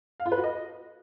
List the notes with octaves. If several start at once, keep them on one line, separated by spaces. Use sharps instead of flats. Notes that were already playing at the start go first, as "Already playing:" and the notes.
F5
F4
B4
F#4
D#5